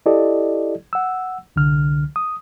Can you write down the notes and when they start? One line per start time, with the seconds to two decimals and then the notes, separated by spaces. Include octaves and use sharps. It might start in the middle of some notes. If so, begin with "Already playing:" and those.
0.06 E4 G4 A4 D5 D#5
0.93 F#5 E6
1.56 C2 D3 F6
2.16 D#6